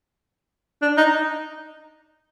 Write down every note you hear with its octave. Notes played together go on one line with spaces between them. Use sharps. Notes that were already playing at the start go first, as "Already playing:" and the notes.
D4
D#4